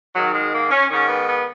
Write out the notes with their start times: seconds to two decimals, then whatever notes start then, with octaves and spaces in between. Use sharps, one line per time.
0.15 G#2 D#3 F#3
0.33 G#3
0.52 A#3
0.70 C#4
0.89 G#2 D#3 C#4
1.08 B3
1.26 B3